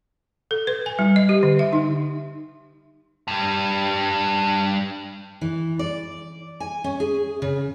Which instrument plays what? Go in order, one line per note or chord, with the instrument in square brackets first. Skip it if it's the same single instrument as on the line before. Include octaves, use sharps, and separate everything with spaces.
[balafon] A4
B4
G#5
G3
D#5
G4
D3
E5
D#4
[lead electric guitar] G2 G3
[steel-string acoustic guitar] E3
D5
G#5
C#4
G#4
C#3